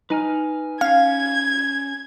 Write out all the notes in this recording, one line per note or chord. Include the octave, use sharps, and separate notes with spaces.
D#4 B4 G#5 F6
C#4 F5 G#6